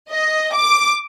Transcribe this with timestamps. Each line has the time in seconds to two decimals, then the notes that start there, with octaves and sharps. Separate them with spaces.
0.11 D#5
0.54 D6